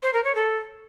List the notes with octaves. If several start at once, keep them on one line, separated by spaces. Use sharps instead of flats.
C5
A#4
C#5
A4